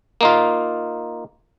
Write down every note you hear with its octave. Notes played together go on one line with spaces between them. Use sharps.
A#3 D#4 F4